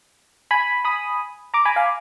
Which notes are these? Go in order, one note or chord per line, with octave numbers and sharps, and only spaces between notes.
G#5 B5
B5 D#6
A#5 D6
G#5 B5
F5 G#5